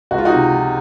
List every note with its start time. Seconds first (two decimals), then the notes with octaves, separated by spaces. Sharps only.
0.11 C#2 F#4
0.18 F4
0.25 D#4 F#4
0.33 C3
0.53 F3